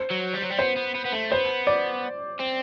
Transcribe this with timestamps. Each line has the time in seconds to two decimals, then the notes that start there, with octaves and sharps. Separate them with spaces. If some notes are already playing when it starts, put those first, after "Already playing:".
Already playing: C5
0.11 F#3
0.35 G3
0.43 F#3
0.51 G3
0.59 B3 C5
0.77 B3
0.95 B3
1.06 B3
1.13 A3
1.31 B3 C5
1.67 D5
2.39 C4